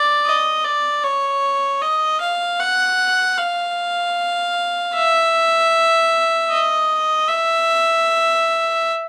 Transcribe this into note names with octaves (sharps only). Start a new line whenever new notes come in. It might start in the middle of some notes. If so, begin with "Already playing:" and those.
Already playing: D5
D#5
D5
C#5
D#5
F5
F#5
F5
E5
D#5
E5